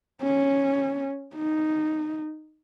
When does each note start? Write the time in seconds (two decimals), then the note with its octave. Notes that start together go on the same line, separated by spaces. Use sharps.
0.22 C#4
1.35 D#4